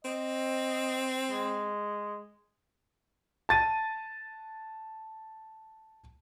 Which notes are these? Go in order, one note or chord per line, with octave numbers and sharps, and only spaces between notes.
C4 D#5
G#3
A5 A6 D#7